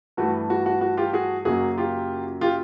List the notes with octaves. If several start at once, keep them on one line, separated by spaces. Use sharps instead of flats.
G2 E3 A3 F#4
F#4
F#4
F#4
F4 G4
F#4 G#4
F#2 C#3 F#3 A#3 F#4 G#4
F4 G4
F4 G4